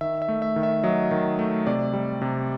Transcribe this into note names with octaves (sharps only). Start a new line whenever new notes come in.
D#3 E5
E5
A3
E5
D#3
E5
F#3 D#5
D#3
A3
C3 D5
G3
C3